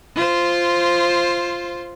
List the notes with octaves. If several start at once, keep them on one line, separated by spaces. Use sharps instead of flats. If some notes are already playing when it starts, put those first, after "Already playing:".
F4 C5